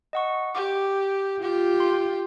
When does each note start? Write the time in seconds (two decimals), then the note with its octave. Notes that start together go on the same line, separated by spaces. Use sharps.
0.13 D#5 F#5 C#6
0.55 G4 D6
1.42 F4 G4
1.80 C6